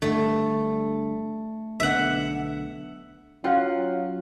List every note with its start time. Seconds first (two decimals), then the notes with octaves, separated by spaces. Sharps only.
0.02 G1 G2 D3 A3
1.80 B1 D3 B3 E5 F#5
3.44 F#3 C#4 F4 C#5 F5 F#5